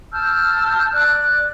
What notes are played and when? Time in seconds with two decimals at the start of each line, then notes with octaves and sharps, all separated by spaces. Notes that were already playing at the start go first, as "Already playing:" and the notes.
0.12 A5 E6 F6 G6
0.92 D5 F#6